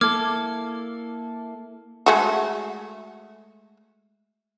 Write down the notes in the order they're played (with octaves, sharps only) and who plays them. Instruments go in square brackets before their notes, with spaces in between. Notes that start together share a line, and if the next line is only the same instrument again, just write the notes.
[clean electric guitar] A#3 E4 A4 [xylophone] D6 F6 G#6
[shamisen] G#3 A3 F#4